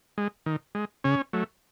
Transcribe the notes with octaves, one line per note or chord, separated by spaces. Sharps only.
G#3
D#3
G#3
C#3 C#4
F#3 A3